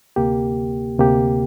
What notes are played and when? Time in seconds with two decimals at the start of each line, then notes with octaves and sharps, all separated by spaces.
0.16 D2 C3 A#3 G4
0.98 D2 C3 A#3 G4